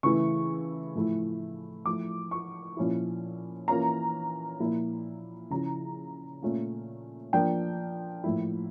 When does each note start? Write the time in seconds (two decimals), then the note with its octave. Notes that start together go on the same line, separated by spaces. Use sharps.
0.03 C#3 E3 A3 E4 C#6
0.95 A2 F3 A3 E4
1.86 F3 A3 E4 D6
2.31 C#6
2.77 A#2 F3 C#4 E4
3.68 E3 A#3 C#4 F4 A#5
4.60 A#2 F3 A#3 E4
5.50 C#3 F3 C#4 E4 A#5
6.42 A#2 A3 C#4 F4
7.33 F3 A#3 D4 F4 G5
8.24 A2 F3 A#3 E4